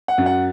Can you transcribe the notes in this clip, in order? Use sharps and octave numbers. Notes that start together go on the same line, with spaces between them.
F#5
F#2
F#5